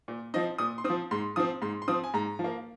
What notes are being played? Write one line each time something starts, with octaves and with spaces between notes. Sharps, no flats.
A#2
F3 C4 D#5
A#2 D#6
C6
C4 D#6
F3
G#2 C6
F3 C4 D#6
G#2 C6
C6
F3 C4 D#6
G#5
G#2 A#5
F3
A#3